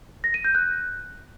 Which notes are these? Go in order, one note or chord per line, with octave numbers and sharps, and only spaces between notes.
A#6
D#7
G6
F#6